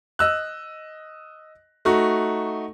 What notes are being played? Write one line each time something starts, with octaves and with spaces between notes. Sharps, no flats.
D#5 E6 F#6
A3 D#4 F#4